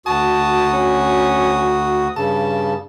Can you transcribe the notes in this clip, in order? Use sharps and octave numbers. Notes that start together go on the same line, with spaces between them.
D2 F#4 A5 D#6
C#4
G2 C#3 A5